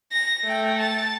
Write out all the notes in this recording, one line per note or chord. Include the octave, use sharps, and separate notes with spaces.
A#6
A3 G5
A5